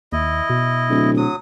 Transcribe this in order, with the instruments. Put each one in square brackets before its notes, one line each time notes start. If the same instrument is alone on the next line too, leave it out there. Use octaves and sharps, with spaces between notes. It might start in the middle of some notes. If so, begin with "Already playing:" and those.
[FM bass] D#2 [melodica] E4 D#5
[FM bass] B2
[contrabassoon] D1
[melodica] F#3 D#6